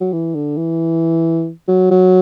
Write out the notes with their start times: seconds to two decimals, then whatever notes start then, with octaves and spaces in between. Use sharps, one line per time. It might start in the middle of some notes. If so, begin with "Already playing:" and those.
0.01 F#3
0.13 E3
0.35 D3
0.57 E3
1.68 F#3
1.91 F#3